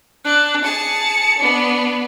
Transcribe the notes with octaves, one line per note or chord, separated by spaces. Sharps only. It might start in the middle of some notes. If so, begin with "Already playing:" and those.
D4 F#6
G#4 A5 C#7
B3 D4